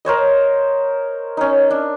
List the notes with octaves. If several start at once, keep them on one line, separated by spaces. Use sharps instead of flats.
A#4 C5 C#5 D#5
C#4 D#4
D4